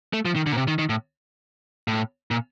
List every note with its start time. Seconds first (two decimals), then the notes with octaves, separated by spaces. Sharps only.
0.13 A3
0.25 F3
0.36 D#3
0.47 D3
0.52 A#2
0.57 C3
0.68 D#3
0.79 D#3
0.89 A2
1.88 A2
2.31 A#2